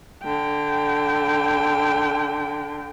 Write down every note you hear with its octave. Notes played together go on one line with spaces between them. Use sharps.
D3 G5